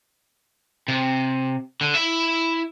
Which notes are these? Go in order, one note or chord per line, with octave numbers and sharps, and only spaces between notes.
C3
D3
E4 E5